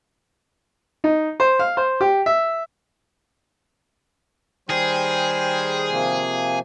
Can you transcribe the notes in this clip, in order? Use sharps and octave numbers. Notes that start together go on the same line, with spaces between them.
D#4
C5
F5
C5
G4
E5
D#3 G3 G#4 C5
C3 F3 A#3